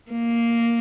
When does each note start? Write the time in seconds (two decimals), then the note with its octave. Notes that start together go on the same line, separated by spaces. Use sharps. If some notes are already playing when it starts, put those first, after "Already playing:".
0.11 A#3